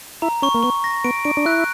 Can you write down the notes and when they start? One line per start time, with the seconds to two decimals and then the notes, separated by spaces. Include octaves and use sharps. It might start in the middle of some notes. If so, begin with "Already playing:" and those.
0.22 E4 A#5
0.42 C#4 C#6
0.55 A#3
0.63 B3 C#6
0.84 A#6
1.04 B3 D7
1.25 D4 D7
1.37 D4
1.45 E4 F#6